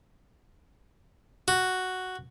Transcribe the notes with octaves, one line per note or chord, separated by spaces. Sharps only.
F#4